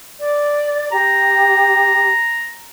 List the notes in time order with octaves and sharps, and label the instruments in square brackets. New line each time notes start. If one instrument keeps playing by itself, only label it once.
[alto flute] D5
[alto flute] G4 [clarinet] A#5